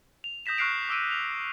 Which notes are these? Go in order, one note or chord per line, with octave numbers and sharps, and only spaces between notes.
F7
D#6 G6 A#6 B6 E7
C#6 F6 F#6 C7 D7 F7
D6 E6 D7 D#7
F7